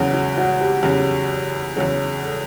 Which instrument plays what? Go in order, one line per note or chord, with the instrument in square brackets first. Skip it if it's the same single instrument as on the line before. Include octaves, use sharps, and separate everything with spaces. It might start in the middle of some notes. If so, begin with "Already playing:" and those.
Already playing: [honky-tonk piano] E2 C#3 F#3 [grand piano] F#4
[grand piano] F#4
F#4
G4
[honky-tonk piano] E2 C#3 F#3 [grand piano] G4
[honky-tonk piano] E2 C#3 F#3 [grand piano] G#4
[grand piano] A4